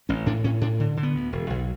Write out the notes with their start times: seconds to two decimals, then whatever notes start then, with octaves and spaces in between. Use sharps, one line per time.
0.09 A1 C#4
0.26 A2 D4
0.44 A2 C#4
0.61 A2 D4
0.80 D3
0.97 D3
1.03 B3
1.15 D2
1.32 E1
1.50 B1